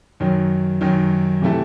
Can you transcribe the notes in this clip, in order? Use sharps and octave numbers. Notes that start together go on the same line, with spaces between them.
F#2 D#3 F#3
F#2 D#3 F#3
C3 E3 A3 E4 A4